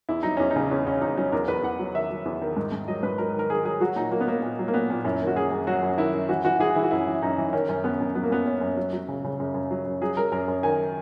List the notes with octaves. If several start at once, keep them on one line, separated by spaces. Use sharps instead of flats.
E2 E4
F#3 D#4
E2 C#4
D#4
C#3
E2 C#4
E2 C#4
E2 D#4
F#3 C#4
E2 A#4
E2 B4
E2 F#5
F#3
D#3 E5
F#3
E2
D#3
G#2
G#2
F#3 D#5
G#2 B4
F#3 A#4
D#3 A#4
D#3 G#4
F#3 G#4
F#3 F#4
A#2 D#4
F#3 A#3
B3
F#3 A#3
A#2
F#3
A#3
A#2 B3
A#2
F#2 E4
D#3
F#4
F#2 G#4
F#2
F#3 F#4
F#2
D#3 E4
F#2
E3 F#4
E3 F#4
E3 G#4
E3 E4
F#4
F#2 E4
E3
F#2 D#4
E3
D#3 C#4
F#2 C#4
F#2 B3
F#2
F#3 B3
A#3
F#2 B3
F#2 C#4
F#2
F#3
F#3
C#3
C#3
F#2
F#2
F#3
F#2
F#3 G#4
F#3 A#4
F#2 A#4
F#2
D#3 G#5